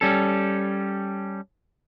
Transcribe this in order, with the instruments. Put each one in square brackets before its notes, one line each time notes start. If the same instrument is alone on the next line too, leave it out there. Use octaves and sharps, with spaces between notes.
[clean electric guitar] G3 C#4 A4